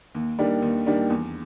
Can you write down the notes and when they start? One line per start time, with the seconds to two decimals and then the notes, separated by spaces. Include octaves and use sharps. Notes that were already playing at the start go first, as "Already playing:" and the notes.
0.14 D#2
0.38 D#3 G3 A#3 D4
0.62 D#2
0.86 D#3 G3 A#3 D4
1.10 E2